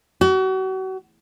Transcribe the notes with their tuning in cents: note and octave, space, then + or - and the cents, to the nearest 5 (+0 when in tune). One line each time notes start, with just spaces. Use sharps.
F#4 +35